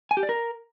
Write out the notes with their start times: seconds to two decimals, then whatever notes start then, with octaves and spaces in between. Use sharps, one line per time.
0.11 G#5
0.17 G4
0.23 D5
0.29 A#4